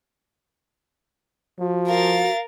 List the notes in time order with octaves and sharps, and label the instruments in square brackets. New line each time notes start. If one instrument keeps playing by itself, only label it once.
[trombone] F3 [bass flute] F#4
[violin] A#4 A6 [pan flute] F5